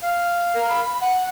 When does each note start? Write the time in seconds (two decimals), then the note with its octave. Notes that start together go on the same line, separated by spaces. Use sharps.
0.03 F5
0.54 A#4
0.69 B5
1.01 F#5